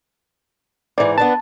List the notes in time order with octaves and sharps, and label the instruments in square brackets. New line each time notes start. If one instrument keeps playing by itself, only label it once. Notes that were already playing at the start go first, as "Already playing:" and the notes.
[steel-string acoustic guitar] G#2 E3 [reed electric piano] D5
[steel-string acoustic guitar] B3 D4 B4 [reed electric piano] A5